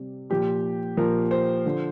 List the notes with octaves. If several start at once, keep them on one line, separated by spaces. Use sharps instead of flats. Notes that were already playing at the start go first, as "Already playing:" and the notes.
Already playing: C3 G3
A#2 F3 G4
A#2 F3 A#4
C5
D3 F3